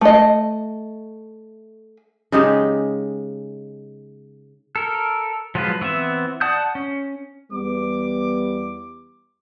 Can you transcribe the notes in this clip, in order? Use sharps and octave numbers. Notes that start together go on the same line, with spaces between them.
A3 D#5
C#3 G#3 D#4 G4
A4 A#4
F3 F#3 G#3 F4 B4
E3 B3 C4 E5
D5 F#5 A5 D#6 G6
C#4
E2 G3 B3 D6